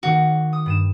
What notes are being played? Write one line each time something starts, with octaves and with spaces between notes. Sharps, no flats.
D#3 A#3 F#4
D#6
G2 D#7 E7